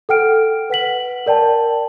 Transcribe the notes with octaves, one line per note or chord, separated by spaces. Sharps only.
A4 F#5 G5 F6 D7
B4 F#5 B6 F#7
A#4 D5 G5 A5